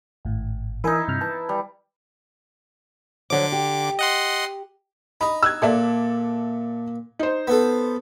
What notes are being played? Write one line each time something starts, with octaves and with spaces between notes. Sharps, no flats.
G#1 A2
E3 D#4 E4 A#4 G#5
G2 C3 F6
E3 A5
G3
D3 F3 F#3 D6
G4
D#5 F#5 C6
D#4 B5
E6 F#6 G#6
A#2 A4 D5 E5
D#4 C5
B3 A4